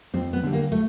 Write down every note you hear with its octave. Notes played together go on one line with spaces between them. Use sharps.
F2 C4
B3
D3 G3
A#3
A3